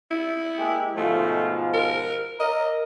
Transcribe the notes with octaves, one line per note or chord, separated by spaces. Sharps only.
E4
G#3 A#3 G4
G#2 B2 F3 A3
A#4
A#4 D#5